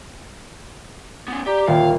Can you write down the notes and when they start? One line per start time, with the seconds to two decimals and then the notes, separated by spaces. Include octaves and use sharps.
1.28 B3 C#4
1.46 G4 D5 A#5
1.67 D#1 A#3 F4 F5 G5